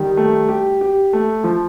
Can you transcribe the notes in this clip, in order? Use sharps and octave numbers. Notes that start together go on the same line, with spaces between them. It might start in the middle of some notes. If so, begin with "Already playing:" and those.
Already playing: D#3 G3
A3
G4
G4
A3
F3